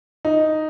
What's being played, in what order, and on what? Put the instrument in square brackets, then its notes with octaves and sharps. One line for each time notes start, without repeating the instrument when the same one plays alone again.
[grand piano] D#4